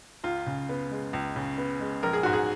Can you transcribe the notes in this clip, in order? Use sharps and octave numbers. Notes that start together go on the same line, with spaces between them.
C#2 F4
C#3
B3
G#3
C#2
C#3
B3
G#3
A#1 A#4
G#4
G#2 F#4
G#4